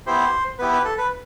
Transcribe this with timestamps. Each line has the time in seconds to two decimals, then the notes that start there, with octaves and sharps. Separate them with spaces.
0.07 B3 E4 G4 C5
0.59 B3 E4 G4 B4
0.73 B4
0.85 A4
0.98 B4